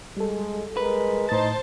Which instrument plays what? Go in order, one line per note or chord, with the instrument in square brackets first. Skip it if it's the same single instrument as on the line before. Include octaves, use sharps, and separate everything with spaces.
[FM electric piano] G3 A4 [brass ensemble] G#3
[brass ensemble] G#3 A#4 [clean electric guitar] B4
[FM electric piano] A2 A6 [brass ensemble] D#4 [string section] C5 A5